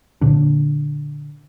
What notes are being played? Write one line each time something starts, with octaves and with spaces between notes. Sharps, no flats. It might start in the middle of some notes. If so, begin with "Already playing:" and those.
A#2 D3 D4